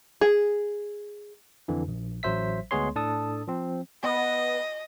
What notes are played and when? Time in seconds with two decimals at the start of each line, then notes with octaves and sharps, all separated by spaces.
0.21 G#4
1.68 F2 D3 E3
1.88 A#1
2.23 A1 F#3 C5 E5 B6
2.71 D2 G#3 B3 G#4 C#5 C6
2.95 A2 D4 A4 A5 D#6
3.48 F3 C4
4.03 B3 D#5